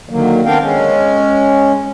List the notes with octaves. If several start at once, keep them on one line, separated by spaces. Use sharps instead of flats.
D3 D#3 F#3 A#3
B3 C4 D4 A#4 F5 G5
G#3 C#4